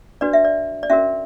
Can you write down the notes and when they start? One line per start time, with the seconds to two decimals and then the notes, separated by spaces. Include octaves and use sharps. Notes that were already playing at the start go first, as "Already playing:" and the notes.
0.21 D4 F#4 B4 D5
0.33 E5
0.45 D5
0.83 D5
0.90 C#4 F#4 A#4 E5